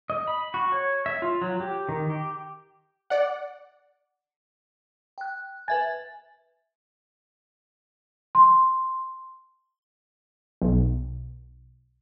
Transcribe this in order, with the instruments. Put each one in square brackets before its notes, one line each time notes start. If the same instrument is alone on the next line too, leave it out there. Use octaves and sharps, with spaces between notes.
[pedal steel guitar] D#5
B5
F#4
C#5
E5
F4
F#3
G4
D#3
G4
[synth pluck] D5 F#5
[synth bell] G5 F#6
[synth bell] B4 E5 G#6 [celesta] G#5 A6
[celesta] C6
[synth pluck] B1